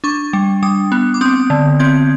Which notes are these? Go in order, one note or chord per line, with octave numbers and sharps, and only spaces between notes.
D4 C#6
G3
G3 D#6
B3
D6
C4 D#6
D3
C4 G#6